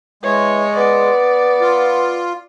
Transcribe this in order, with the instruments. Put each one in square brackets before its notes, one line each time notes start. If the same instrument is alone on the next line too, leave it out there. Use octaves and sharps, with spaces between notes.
[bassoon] E3 [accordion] G#3 [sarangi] C#5
[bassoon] B3 [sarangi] D5
[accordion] F4